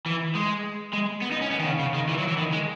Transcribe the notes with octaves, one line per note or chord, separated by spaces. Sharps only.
E3
G#3
G#3
B3
D#4
C#4
B3
D#3
C#3
C#3
D#3
E3
F#3
E3
D#3
G#3